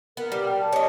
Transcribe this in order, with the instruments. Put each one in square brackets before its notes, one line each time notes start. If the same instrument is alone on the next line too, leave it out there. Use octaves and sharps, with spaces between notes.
[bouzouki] B3 [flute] A#4
[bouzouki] G3
[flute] G5
A5
[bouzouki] C#5 D#5